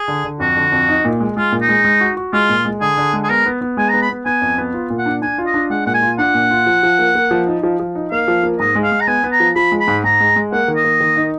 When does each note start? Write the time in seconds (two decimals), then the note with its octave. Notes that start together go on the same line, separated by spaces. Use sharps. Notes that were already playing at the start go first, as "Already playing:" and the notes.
Already playing: G#4
0.08 D3
0.24 D3
0.40 F2 F#4
0.56 D3
0.72 F2
0.89 D#4
1.05 A#2
1.20 G#3
1.36 G#3 F4
1.52 A#2
1.61 D#4
1.69 G#3
1.85 G#3
2.01 F#4
2.17 F#4
2.33 G#3 F4
2.49 A#2
2.65 G#3
2.81 D3 G#4
2.98 D3
3.13 G#3
3.24 G#4
3.29 B3 A#4
3.46 B3
3.61 B3
3.77 G#3 G#5
3.89 A#5
3.93 B3
4.02 B5
4.10 B3
4.26 B3 G#5
4.42 F2
4.58 B3
4.74 F4
4.90 A#2
4.98 F#5
5.06 D4
5.22 D4 G#5
5.38 F4
5.46 D#5
5.54 D4
5.70 G#3 F#5
5.86 A#2 F#5
5.94 G#5
6.02 F4
6.18 D4 F#5
6.34 A#2
6.51 F4
6.66 F3
6.83 F3
6.99 A#3
7.15 A#3
7.31 F3
7.47 D#4
7.63 F3
7.79 F3
7.95 D#4
8.11 A#3 F5
8.28 F3
8.43 A#3
8.60 G#2 D#5
8.75 G#3
8.83 F5
8.92 G#3
9.00 A#5
9.08 B3 G#5
9.24 B3
9.32 A#5
9.40 F3
9.56 F3 B5
9.72 G#3
9.80 B5
9.88 G#2
10.04 G#2 A#5
10.21 G#3
10.36 G#3
10.52 A#3 F#5
10.68 D#3
10.76 D#5
10.84 A#3
11.00 D#3
11.16 D#4